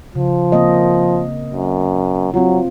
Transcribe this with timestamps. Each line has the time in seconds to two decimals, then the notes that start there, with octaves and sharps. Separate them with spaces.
0.15 C#3 F3
0.52 A#3 C4 D#5
1.53 F#2
2.34 F#3 C4 F4